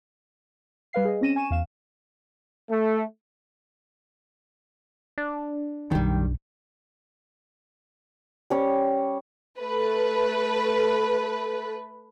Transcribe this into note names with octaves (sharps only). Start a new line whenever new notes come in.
G3 B4 F5 C7
G#4 D#5
C4 C#4 A#6 D#7 E7
G#5 C#6 D#7 E7
E2 F5 E7
A3
D4
B1 F#2 D#3 G3
G3 C#4 C#5
A3 B4